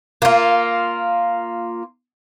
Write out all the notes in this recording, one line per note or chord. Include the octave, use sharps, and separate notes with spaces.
A#3 F4